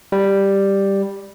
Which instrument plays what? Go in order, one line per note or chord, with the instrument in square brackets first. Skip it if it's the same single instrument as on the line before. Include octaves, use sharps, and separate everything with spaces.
[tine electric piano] G3